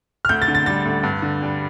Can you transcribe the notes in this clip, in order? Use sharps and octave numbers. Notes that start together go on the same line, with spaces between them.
F6
D2 G6
A6
D3
A6
G3 A6
D2
G2
D3
G3